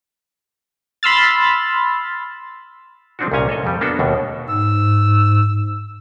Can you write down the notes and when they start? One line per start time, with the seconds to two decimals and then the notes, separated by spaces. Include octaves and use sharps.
1.03 B5 C6 E6 F6 A6
3.19 F3 B3 C4 D4 D#4 F#4
3.32 C2 A#2 C#4 G#5 A#5
3.49 A4 C#5 D#5
3.64 F2 C#3 G3
3.81 A#3 B3 D4 F#4 A4
3.99 D#2 B2 A3
4.49 G#2 E6